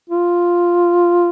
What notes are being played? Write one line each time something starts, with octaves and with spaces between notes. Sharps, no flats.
F4